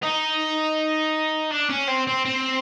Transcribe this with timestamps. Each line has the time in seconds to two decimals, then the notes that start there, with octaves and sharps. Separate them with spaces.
0.03 D#4
1.51 D4
1.70 C#4
1.88 C4
2.07 C4
2.25 C4